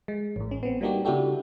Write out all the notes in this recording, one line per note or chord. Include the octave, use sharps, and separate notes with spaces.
G#3
A1 A2
C#4
B3 C4
G3 A#3 D4 D#4 F#4 G4
C#3 D4 E4 F#4 G4 A4